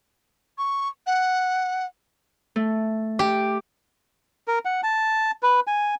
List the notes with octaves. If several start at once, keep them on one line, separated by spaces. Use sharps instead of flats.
C#6
F#5
A3
G4
A#4
F#5
A5
B4
G#5